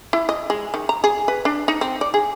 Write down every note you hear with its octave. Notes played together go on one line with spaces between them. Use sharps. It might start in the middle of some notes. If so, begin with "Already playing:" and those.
E4
D#5
G#3
D#3
A#5
G#4
B4
D4
D#4
C4
D5
G#4